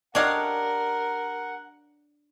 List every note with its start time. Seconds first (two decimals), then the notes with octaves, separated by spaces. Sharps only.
0.15 D4 G4 A#4 C#5 D#5 F5 F#5